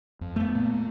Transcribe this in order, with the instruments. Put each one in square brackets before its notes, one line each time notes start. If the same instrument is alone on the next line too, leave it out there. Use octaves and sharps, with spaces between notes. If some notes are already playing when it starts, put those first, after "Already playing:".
[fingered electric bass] F2
[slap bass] A3 B3
[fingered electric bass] A#2 A#3